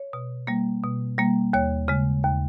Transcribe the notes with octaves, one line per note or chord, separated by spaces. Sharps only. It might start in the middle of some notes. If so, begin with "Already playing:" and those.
Already playing: C#5
B2
G3 A#3
B2
G3 A#3
D#2 C#5
C#3 G#3
D#2